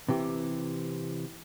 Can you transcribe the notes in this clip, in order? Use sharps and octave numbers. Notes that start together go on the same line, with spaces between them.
C3 E3 G4